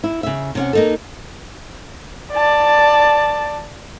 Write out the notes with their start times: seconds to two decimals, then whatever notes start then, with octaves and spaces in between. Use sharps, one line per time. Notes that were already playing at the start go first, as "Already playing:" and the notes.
0.04 E4
0.23 C#3 E5
0.55 C3 C#4 F#5
0.73 A#3 D#4 A4
2.33 D5 A5